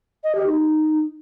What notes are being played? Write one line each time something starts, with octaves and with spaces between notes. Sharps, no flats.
D#5
G4
D#4